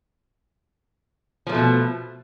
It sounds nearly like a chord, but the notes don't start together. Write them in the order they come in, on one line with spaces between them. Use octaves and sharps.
F3 A#3 A3 B2